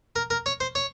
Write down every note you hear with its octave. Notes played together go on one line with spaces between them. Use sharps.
A#4
A#4
C#5
C5
C#5